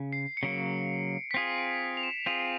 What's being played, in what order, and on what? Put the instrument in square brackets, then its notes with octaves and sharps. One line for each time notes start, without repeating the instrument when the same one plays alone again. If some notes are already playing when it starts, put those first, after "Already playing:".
Already playing: [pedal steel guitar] C#3
[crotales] C7
C#7
[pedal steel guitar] C#3 F#3 A#3 [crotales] D7
[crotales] B6
[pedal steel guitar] C4 F4 G#4 [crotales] C7
[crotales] D7
F7
E7
[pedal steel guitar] C4 F4 G#4 [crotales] F7